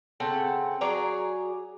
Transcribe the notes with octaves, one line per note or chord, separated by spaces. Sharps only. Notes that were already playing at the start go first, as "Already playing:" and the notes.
C#3 C4 A4 F#5
F#3 G#4 D5 A#5